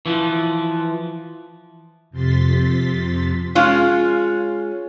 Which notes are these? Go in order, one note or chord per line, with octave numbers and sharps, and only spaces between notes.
E3 F3
F2 C3 C6 A6 B6
G#3 C#4 F4